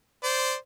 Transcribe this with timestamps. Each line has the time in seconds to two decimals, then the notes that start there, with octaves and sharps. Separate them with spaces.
0.23 C5 D5